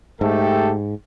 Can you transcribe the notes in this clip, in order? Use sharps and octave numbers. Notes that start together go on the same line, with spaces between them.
G#2 A3 G4 A4